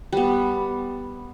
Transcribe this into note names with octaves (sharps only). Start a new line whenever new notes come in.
G3 B3